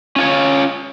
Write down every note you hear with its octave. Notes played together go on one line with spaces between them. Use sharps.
C#4 F4 C#5